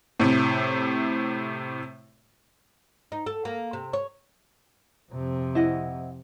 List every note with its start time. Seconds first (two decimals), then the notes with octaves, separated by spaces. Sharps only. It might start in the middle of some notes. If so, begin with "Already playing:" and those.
0.20 A2 C3
3.12 D#4
3.26 A4
3.45 A#3
3.73 C3
3.93 C#5
5.12 F2 C3
5.55 E4 D#5 F#5